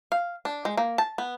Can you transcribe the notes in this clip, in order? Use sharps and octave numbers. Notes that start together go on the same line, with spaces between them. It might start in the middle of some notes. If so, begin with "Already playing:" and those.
F5
D4
G#3
A#3
A5
B3